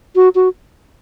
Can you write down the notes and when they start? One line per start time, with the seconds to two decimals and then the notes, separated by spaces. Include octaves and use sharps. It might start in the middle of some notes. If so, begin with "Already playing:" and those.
0.15 F#4
0.35 F#4